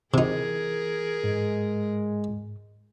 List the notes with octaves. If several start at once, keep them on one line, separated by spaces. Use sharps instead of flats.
C3 E3 D#4 G#4 A#4
G#2 G#3